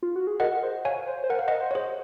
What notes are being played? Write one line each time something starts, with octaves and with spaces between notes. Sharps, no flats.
F4
F#4
G#4
A#4 D#5 F#5
C5
C#5 F5 G#5
C5
C5
A#4 F#5
F5
D#5 F#5
C5
C#5
G#4 C5